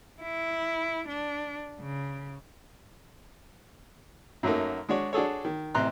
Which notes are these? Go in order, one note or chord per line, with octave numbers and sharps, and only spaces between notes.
E4
D4
C#3
F#2 F#3 A3 A#3 D#4
G#3 D4 F#4 C#5
D4 F#4 G#4 A4 C#5
D#3
A1 C3 A#5 C6 F#6